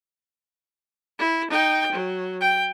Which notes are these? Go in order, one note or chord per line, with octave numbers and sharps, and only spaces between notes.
E4
D#4 G5
F#3
G5